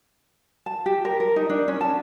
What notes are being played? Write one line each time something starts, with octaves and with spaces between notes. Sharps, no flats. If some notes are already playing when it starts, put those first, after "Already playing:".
A5
G4
A#4
A#4
D#4
D4
C#4
A5